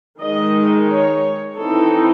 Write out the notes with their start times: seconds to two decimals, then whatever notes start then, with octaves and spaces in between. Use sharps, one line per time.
0.20 D#3 G#3 D#4 D#5
0.88 C#5
1.57 E3 C4 D#4 A4